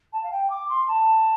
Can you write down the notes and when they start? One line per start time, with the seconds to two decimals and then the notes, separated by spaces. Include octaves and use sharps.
0.12 A5
0.23 F5
0.31 G5
0.50 D6
0.69 C6
0.88 A5